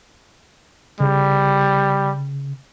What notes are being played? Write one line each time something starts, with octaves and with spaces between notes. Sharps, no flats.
C#3 G3